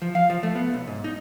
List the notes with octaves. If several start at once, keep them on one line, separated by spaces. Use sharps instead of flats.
F3
F5
F3
A3
B3
B1
G#2
D#4